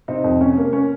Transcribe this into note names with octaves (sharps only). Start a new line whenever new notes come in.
C3 C4 D#4
F2
C3 C#4
A#3
A#3 C#4